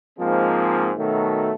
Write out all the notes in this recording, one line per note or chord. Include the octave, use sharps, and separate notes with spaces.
G#2 F3 G#3 A#3 C4
B2 D#3 F#3 A3